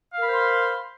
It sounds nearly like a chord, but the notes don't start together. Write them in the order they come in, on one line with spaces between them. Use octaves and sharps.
F5 A#4 B5 C5 C6